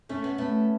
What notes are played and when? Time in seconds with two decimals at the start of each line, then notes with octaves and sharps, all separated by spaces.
0.09 A3 C#4
0.24 B3
0.38 A3 B3